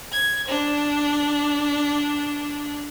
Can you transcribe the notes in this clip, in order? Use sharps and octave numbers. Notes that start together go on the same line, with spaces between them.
G#6
D4